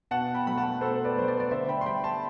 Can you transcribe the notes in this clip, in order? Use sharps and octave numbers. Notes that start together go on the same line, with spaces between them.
B2 F#5 A5
G5 B5
F#3 A3 B5
F#5 A5
B2 A4 C5
B4 D5
F#3 A3 C5
B4 D5
D5
D3 C5 E5
G5 B5
C6
G3 G5 B5
A5 C6